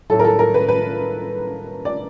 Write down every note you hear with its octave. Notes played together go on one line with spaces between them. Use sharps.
A2 F#3 A4
A#4
A4
A#4
B4
B4
D5